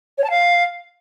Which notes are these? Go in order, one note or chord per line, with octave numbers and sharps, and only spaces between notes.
C#5
A5
F5